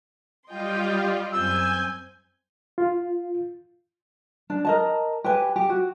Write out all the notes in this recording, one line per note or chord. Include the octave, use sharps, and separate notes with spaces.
G3 F4 D#5 G5 C6
F#2 C4 G#5 E6 G6
F4
D4
A#4 D#5 A5
G4 B4 G#5
G4
F#4